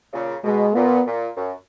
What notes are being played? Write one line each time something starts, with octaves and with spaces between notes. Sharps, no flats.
A#2 C#3
B2 G#3
A#2 B3
A#2
F#2